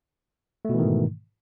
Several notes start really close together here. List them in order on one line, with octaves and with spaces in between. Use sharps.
A3 B2 E3 D#3 G#2